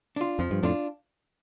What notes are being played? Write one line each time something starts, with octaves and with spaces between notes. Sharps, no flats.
D4 F4
F2 F3
G2
F2 A2 D4 F4